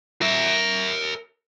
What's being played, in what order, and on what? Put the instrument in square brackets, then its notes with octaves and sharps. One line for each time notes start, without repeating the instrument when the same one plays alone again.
[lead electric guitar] A#4 E5